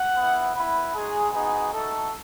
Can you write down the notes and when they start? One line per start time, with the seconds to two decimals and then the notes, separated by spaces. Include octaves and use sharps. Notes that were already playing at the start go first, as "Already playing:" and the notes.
Already playing: F#5
0.16 B3 E4
0.56 B3 E4 B4
0.94 G#3 D#4 F#4 G#4
1.33 B3 D#4 F#4 G#4
1.73 A3 D#4 F#4 A4